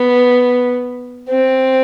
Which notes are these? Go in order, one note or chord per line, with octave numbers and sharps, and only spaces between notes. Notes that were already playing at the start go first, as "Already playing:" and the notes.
Already playing: B3
C4